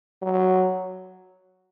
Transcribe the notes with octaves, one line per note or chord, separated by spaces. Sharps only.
F#3